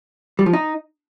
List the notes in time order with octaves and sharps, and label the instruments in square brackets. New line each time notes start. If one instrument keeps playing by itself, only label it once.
[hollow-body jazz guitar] G3
F3
D#4